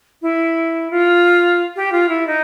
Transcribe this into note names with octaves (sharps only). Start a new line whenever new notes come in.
E4
F4
G4
F4
E4
D#4